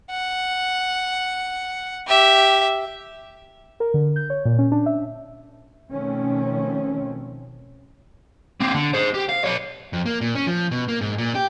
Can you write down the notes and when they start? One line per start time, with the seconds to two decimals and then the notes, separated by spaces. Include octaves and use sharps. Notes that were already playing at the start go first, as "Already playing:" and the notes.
0.11 F#5
2.07 G4 E5
3.80 A#4
3.94 D3
4.16 G6
4.30 C#5
4.45 A#2
4.59 C#4
4.72 D4
4.86 E5
5.91 B2 D#3 F3 A3 C4 C#4
8.60 A#3 C4
8.74 D3
8.93 G#4 C5
9.14 G4
9.29 F5
9.44 B4 C#5
9.93 F2
10.06 A#3
10.21 A#2
10.35 C#4
10.47 F3
10.71 B2
10.88 A#3
11.01 G#2
11.18 A#2
11.35 G4